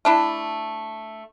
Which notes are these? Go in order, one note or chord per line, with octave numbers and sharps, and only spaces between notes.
A3 D4 E4